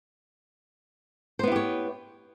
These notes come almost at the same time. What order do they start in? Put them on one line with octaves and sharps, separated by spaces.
C5 B3 E4 G4 C#5